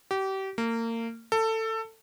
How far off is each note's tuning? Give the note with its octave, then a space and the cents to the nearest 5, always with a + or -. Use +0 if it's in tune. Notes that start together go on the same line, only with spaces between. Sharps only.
G4 -30
A#3 -30
A4 +20